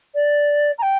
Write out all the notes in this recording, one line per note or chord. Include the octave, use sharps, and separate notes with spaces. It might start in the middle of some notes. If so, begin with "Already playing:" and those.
D5
A#5
G5